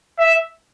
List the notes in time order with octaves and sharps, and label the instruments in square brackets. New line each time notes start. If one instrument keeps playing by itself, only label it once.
[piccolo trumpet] E5